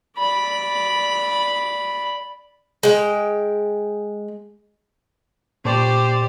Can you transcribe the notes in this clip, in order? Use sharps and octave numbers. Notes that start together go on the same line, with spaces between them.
D5 B5
G#3 G5
A#2 G4 C5 D5